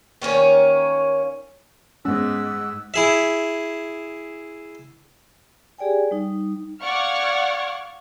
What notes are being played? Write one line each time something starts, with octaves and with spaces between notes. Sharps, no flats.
D#3 A#3 C#4 C#5
G#2 B3 C#4 F#5 E6
E4 G#4 E5
G4 G#4 D5 G5 G#5
G3 D#4
D5 F5 F#5 C#6 F6 G#6